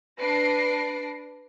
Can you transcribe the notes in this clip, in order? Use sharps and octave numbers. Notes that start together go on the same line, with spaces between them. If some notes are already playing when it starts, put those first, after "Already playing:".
D4 B4 A#6 C7 D7